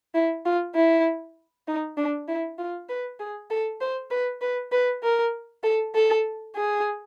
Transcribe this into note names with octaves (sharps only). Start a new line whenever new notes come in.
E4
F4
E4
D#4
D4
E4
F4
B4
G#4
A4
C5
B4
B4
B4
A#4
A4
A4
G#4